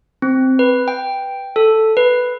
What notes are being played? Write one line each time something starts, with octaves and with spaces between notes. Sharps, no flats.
C4
B4
G5
A4
B4